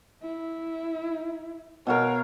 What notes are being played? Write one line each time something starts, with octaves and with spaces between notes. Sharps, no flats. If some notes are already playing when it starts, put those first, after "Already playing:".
E4
B2 F#4 A#4 C#5 F5